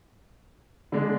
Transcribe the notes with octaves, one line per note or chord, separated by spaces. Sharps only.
D3 G#3 D4